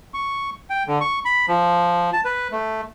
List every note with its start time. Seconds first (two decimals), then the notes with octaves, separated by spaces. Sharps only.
0.14 C#6
0.70 G5
0.87 D3
1.01 C#6
1.25 B5
1.48 F3
2.13 A5
2.25 B4
2.52 A3